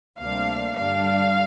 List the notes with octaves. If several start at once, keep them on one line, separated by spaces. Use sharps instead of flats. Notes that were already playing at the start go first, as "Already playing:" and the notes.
D2 C3 G3 A#3 D4 F5
G2 D3 G3 D4 F5